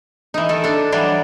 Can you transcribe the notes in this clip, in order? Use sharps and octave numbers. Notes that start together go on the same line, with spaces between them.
E3 D#4
D#3 A4
D4 A4
E3 F#3 G3 D4